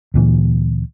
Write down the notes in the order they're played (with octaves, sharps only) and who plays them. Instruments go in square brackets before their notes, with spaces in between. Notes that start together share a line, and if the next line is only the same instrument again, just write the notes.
[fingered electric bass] D2 A#2 E3